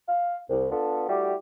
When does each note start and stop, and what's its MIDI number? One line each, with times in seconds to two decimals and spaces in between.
0.08 0.40 77
0.49 0.68 36
0.71 1.04 59
0.71 1.04 62
0.71 1.04 65
0.71 1.04 69
1.09 1.34 55
1.09 1.34 57
1.09 1.34 64
1.09 1.34 66
1.09 1.34 67